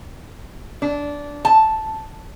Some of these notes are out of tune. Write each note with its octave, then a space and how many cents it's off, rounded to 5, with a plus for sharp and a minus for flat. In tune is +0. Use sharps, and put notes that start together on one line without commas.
D4 -15
A5 -5